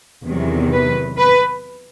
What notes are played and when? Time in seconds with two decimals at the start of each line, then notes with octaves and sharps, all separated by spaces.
0.23 E2 C3 D#3 F#3
0.72 B4
1.18 B4